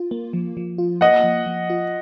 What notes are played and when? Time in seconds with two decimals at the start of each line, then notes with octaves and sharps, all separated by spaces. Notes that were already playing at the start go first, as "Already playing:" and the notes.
Already playing: F4
0.11 A#3
0.33 F3
0.57 F3
0.78 F4
1.01 A#3 D#5 F#5
1.23 F3
1.46 F3
1.70 F4